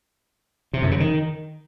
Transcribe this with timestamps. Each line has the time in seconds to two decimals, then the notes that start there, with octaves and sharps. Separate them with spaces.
0.73 C3
0.82 F#2
0.91 C#3
1.00 D#3